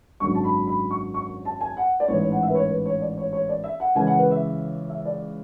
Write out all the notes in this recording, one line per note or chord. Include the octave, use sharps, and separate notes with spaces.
G#1 F#2 D3 F#3 C#6
A5
B5
B5
C#6
C#6
A5
G#5
F#5
D5
A1 G#2 E3 C#5
C#5
F#5
E5
B4
C#5
B4
C#5
D5
C#5
C#5
D5
E5
F#5
C#2 C#3 E3 G#5
F#5
B4
E5
E5
D5